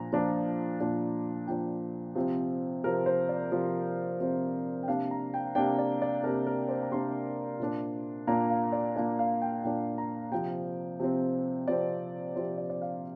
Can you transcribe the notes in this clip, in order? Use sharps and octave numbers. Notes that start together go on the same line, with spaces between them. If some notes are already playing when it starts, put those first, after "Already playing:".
Already playing: A#2 F3 D4 A#5
A#2 F3 D4
A#2 F3 D4
A#2 F3 D4 G5
C3 F3 C4
C3 F3 C4 A#4
C5
D5
C3 F3 C4
C3 F3 C4
G5
C3 A#3 D4 F5
A#5
G5
C3 A#3 D4 G5
D5
D5
C3 A#3 D4 A#4
A#4
C5
A#5
C3 A#3 D4 C6
A#2 A#3 D4
A#2 A#3 D4 A#5
F5
D5
A#2 A#3 D4 D5
F5
G5
A#2 A#3 D4 G5
A#5
C3 F3 C4 G5
C3 F3 C4
C3 F3 C4 D5
C3 F3 C4 C5
D5
D5
F5